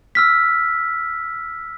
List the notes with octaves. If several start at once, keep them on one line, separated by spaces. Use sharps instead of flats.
E6 F6 B6